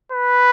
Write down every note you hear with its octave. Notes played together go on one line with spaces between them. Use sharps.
B4